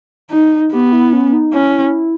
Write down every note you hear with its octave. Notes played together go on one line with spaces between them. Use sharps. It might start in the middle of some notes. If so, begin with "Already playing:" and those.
D#4
B3 G4
E4
C#4
D#4
C#4 E4